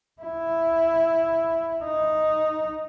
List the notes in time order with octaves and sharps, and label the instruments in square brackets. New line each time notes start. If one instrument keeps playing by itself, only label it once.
[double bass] E4
D#4